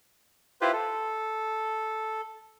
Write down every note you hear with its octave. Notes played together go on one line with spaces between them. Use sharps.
E4 F4 G4 B4 C5
A4